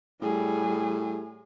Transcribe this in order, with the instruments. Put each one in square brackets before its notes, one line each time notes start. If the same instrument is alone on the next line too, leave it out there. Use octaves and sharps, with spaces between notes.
[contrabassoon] A2 [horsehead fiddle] G3 G#4